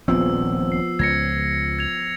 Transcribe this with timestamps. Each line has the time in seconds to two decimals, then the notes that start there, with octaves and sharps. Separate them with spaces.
0.08 D#1 A#1 F3 B3 C4 E6
0.72 C7
0.99 C#2 G#6 A#6 C#7
1.79 G#6 F7